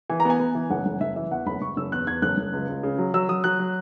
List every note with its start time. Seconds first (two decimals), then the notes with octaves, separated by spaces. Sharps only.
0.10 E3 G#5
0.20 A#5
0.25 B3 G#5
0.40 B3
0.55 E3
0.70 F#1 F#5
0.86 F#1
1.01 F#1 E5
1.16 E3 E5
1.31 E2 F#5
1.46 F#1 B5
1.62 F#1 C#6
1.77 F#1 E6
1.92 E2 F#6
2.07 E2 G#6
2.22 F#1 F#6
2.38 F#1
2.53 C#2
2.68 C#2
2.83 C#3
2.98 F#3
3.14 F#3 E6
3.29 F#3 D#6
3.44 F#3 F#6
3.59 F#3